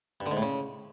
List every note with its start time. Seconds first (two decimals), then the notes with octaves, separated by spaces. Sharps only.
0.21 G2
0.26 D3
0.31 G#2
0.37 A2
0.42 C#3